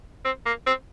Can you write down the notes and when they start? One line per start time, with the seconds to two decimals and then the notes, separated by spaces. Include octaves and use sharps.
0.25 C4
0.46 A#3
0.66 C4